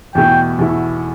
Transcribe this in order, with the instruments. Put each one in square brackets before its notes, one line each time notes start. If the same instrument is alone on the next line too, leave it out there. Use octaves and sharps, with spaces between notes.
[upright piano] E2 B2 A3 E4 [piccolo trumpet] G5
[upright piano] E2 B2 A3 E4